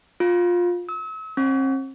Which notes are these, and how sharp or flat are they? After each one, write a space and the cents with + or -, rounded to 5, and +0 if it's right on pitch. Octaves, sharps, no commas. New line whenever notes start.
F4 +15
E6 -40
C4 +45